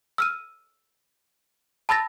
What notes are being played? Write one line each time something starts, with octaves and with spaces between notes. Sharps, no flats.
E6 F6 D#7
A5 B5 E6 A6 A#6